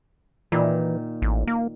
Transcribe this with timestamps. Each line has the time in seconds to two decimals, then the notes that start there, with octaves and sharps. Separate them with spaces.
0.52 A#2 D#3 E3
1.22 A1
1.47 A#3